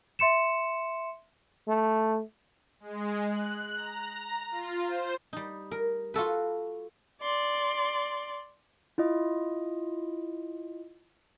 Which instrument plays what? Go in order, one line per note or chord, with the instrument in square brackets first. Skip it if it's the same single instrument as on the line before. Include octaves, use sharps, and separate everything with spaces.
[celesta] E5 C6 C#7 E7
[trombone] A3
[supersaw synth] G#3
F#6
A#5
A#5
F4
C5
[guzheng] G3 D#4
A#4
F4 F#4 A4 B4
[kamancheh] D5 C6
[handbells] E4 F4 D#5